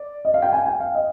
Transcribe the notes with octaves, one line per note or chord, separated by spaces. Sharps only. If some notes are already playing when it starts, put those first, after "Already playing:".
Already playing: D5
D#5
F5
G5
G#5
G5
F5
D#5